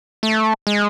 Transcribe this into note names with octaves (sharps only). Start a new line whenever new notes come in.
A3
G#3